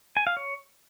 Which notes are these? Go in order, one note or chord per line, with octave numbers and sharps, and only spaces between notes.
G#5
F5
C#5